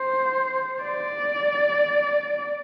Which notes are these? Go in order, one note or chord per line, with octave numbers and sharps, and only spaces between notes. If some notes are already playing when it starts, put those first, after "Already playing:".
Already playing: C5
D5